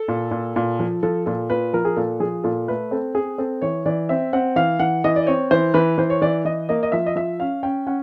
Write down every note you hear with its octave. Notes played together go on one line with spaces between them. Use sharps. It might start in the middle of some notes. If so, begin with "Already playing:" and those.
Already playing: A4
A#2
A#2
A#2
F3
F3 A4
A#2 A4
A#2 B4
F3 A#4
G#4
A#2 A4
F3 G#4
A#2 A4
A3 B4
C4 A4
C4 G#4
C4 A4
E3 C#5
E3 D5
C4 E5
C4 F#5
E3 F5
E3 F#5
E3 D#5
D5
C4 C#5
E3 C5
E3 B4
E3 C5
C#5
E3 D5
E3 D#5
A#3 D#5
D#5
F3 E5
D#5
F3 E5
C#4 F5
C#4 G5
C#4 F#5